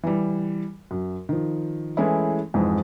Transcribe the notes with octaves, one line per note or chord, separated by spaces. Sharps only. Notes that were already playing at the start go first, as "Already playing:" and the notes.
E3 G3
F#2
D#3 F3
E3 G#3 A3 C#4 E4
F2 G#2 E3 G#3